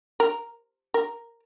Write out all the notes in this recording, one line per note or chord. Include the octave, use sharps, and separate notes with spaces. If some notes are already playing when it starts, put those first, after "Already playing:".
A#4
A#4